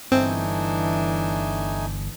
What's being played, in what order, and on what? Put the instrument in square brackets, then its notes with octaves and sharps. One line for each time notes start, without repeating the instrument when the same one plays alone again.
[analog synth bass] G1 [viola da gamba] E3 D4 [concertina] A3 D#4 G#5 [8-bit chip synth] C4